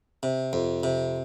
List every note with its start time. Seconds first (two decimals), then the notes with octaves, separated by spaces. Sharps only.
0.23 C3
0.53 F2
0.83 C3